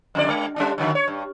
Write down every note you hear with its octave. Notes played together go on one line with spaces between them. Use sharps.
F2 D3 D5
G#3
G3 C#4 D4
D3 D#3 F#3
C#5
G2